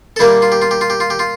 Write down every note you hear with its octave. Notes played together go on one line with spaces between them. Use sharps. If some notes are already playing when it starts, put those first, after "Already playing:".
A4
A#2 G3 A#3 D4 E4 G4
F4
G4
F4
G4
F4
G4
F4
G4
F4